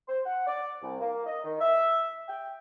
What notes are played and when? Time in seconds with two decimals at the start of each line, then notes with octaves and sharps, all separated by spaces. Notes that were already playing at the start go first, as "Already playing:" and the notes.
0.08 C5
0.26 F#5
0.47 D5
0.82 C2
1.01 A#3
1.26 D#5
1.44 D#3
1.60 E5
2.28 G5